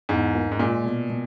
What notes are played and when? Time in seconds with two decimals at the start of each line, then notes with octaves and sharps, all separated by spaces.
0.09 E2 G#2
0.34 A#3
0.52 G#2
0.59 A#2 G#3
0.84 B2
1.10 B2